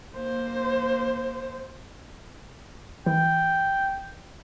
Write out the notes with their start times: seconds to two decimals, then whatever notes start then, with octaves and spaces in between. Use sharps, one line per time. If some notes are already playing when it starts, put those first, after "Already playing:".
0.16 A#3 C5
3.06 E3 G5